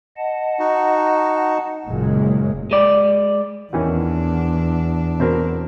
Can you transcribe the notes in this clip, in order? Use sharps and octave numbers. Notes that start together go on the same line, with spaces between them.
D#5 F#5 A5
D#4 F#4
F#1 F#2 A#2 G#3
G#3 D5
E2 D#3 E3 C#4 D4
B2 C4 A#4